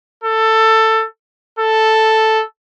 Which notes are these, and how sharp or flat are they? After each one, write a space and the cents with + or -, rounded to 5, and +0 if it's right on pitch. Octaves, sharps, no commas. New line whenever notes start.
A4 +15
A4 +0